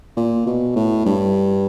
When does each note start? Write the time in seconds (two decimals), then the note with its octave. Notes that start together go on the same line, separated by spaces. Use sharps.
0.17 A#2
0.47 B2
0.76 A2
1.06 G2